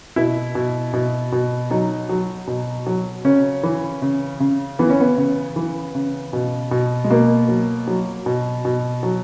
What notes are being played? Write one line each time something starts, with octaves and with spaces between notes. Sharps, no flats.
B2 E4
B2
B2
B2
F#3 D#4
F#3
B2
F#3
C#3 C#4
E3
C#3
C#3
E3 B3
C#4
B3
C#3
E3
C#3
B2
B2
G#3
B2 A#3
F#3
F#3
B2
B2
F#3